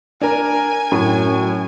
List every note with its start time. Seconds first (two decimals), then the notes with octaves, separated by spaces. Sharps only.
0.21 D4 A#4 G#5
0.92 F#2 A2